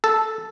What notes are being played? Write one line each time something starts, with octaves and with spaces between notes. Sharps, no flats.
A4